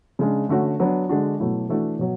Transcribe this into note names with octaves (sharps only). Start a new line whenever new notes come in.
C#3 G#3 D4
D3 A3 C#4 F#4
F#3 B3 D4
D3 G#3 D4 F#4
B2 F#3 A3 E4
E3 A3 D4 F#4
B2 F#3